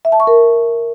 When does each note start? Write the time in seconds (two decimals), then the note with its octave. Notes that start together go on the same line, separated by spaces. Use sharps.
0.05 E5
0.12 A5
0.20 C#6
0.27 A#4